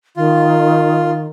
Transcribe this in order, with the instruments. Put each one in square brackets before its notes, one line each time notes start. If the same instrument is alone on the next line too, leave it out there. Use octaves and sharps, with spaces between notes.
[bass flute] D#3 [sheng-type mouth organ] F4